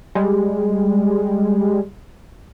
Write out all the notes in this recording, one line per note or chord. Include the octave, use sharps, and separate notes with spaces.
G3 G#3